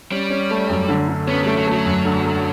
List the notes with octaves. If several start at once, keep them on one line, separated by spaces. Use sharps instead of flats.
G3 C#4
C#4
A3
F#2
D3
D3
B3 C#4
G3 A3
F#3
F#3 A3
F#2
D3
A3